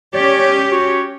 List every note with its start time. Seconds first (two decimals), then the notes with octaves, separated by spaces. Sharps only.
0.14 C#4 G4 C#5 D5
0.71 F#4 C#5